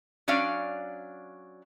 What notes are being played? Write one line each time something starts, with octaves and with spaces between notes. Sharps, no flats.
F#3 C#4 D4 D5 F5